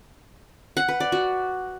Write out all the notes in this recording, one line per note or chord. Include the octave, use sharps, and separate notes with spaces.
F#5
B4
D5
F#4